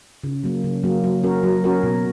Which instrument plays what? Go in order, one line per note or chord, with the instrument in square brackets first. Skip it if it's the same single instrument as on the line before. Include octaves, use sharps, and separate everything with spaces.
[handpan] C#3
F#3 A#3
C#3
F#3 A#3
F#3
C#4 F#4 A#4
F#3
C#4 F#4 A#4
B2